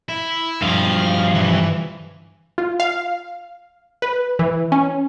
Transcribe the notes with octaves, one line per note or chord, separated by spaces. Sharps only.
E4
G2 F3 F5
E3
F4
F5
B4
E3
C#4